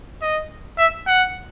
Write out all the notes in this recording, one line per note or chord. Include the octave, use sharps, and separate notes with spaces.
D#5
E5
F#5